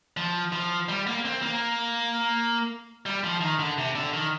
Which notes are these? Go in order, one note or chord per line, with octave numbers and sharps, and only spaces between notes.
F3
F3
G3
A#3
C4
A#3
G3
F3
D#3
D3
C3
D3
D#3